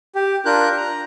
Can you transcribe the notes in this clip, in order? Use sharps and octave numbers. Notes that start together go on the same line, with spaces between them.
G4
D4 F4 A#4 F#6 G6
A#5